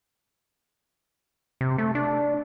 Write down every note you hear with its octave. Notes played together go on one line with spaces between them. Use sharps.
C3
A3
D4